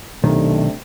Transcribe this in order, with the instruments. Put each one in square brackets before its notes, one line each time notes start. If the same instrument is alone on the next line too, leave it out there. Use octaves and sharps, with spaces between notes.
[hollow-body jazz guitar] B1 D#3 [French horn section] C3 A3 D4